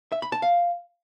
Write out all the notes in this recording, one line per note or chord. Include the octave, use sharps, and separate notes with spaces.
E5
B5
A5
F5